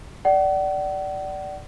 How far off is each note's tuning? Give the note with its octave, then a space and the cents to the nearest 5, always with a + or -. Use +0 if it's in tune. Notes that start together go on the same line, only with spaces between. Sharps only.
D5 +0 F#5 +40